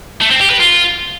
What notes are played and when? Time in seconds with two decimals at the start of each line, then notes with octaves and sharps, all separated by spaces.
0.21 A3
0.31 C4
0.40 G4
0.50 B4
0.59 F4